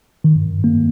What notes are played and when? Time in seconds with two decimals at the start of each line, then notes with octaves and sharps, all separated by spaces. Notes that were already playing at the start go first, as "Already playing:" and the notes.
0.24 D#3
0.64 A#3